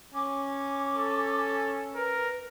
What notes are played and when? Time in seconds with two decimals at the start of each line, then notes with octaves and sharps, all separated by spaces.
0.14 C#4 D6
0.96 A4
1.95 A#4 B4